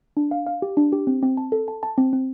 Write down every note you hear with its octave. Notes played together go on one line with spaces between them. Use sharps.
D4
F5
F5
G4
D4
G4
C4
C4
A5
A4
A5
A5
C4
C4